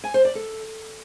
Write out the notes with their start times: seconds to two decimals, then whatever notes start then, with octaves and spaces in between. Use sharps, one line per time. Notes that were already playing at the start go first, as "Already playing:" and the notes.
0.04 G#5
0.14 C5
0.25 D5
0.35 A4